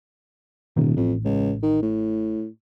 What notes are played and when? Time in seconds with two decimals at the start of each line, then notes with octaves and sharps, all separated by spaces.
0.77 D#1 A1 B2 D#3
0.97 A1 F2
1.25 C#2
1.63 D#3
1.82 A2